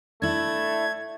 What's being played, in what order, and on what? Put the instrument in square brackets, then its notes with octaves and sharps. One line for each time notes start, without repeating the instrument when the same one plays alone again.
[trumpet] A3 [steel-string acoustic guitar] D4 E4 [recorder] G#6